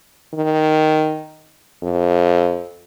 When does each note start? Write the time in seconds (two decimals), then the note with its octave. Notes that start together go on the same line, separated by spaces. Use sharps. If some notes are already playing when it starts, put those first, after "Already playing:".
0.34 D#3
1.83 F2